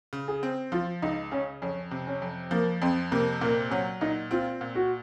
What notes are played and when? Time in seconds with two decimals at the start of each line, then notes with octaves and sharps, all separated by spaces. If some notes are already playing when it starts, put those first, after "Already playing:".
0.13 C#3
0.28 G#4
0.43 C4
0.72 F3 F4
1.02 C#2 D#4
1.31 C#3 C#4
1.62 F2 C#4
1.91 C3
2.07 C#4
2.22 F2
2.51 F3 A#3
2.82 F2 C4
3.12 C3 A#3
3.41 A#2 A#3
3.70 F#3 C#4
4.01 A#2 D#4
4.31 C4 F4
4.61 A#2
4.75 F#4